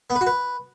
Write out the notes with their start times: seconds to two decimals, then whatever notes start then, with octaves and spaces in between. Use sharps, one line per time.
0.10 B3
0.15 B4
0.21 F#4
0.26 B4